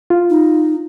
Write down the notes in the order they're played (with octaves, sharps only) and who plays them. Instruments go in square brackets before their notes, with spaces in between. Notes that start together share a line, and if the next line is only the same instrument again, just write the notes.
[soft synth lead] F4
[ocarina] D#4